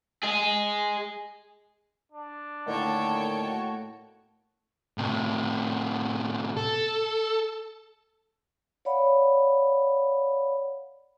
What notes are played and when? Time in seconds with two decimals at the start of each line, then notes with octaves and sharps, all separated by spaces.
0.23 G#4 D#5
2.12 D4
2.67 A2 D3 D#3 A#3 C#5 G5 A5
3.43 F#4
4.98 A2 C3
6.57 A4
8.85 C#5 D5 F5 F#5 B5